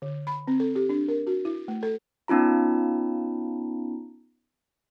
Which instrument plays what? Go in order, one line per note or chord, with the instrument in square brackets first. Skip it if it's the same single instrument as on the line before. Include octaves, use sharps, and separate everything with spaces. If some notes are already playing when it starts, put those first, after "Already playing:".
[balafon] D3
B5
C4
A4
G4
D4
A#4
F#4
E4
A3
A4
[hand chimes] B3 C#4 D#4 F4 A#5